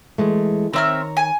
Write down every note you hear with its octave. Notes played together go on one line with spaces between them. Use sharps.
E3 G#3 A3
D#3 C4 C#5 E5 A#5 F6
G#5